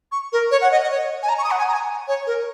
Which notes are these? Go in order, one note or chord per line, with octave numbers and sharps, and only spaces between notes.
C#6
A#4
C#5
F#5
D#5
D#5
C#5
G#5
A#5
C#6
D#6
F#5
G#5
A#5
G#5
C#5
A#4